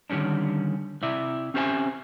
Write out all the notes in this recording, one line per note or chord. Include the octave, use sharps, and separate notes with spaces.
D3 D#3 G3 C#4 D4
C3 E4 D5 E5
C4 C#4 G4 C5 E5 G#5